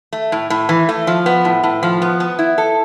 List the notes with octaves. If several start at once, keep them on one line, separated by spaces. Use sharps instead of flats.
A3
A2
A2
E3
A3
F3
B3
A2
A2
F3
B3
B3
E4
A4